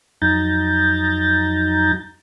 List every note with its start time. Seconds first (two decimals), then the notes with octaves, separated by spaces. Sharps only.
0.22 F2 F#3 D#4 A#5 G6 A6